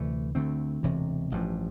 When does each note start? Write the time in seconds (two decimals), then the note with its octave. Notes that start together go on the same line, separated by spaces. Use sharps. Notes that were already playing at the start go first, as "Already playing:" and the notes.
Already playing: D2 C3 E3 A3
0.35 D2 D3 A3 C4
0.83 E1 D2 C3 E3
1.32 A1 G2 F3